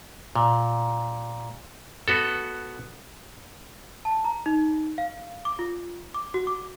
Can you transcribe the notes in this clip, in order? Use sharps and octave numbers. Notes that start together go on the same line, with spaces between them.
A#2
B3 F#4 A4
A5
A#5
D#4
F5
D6
F4
D6
F#4
D6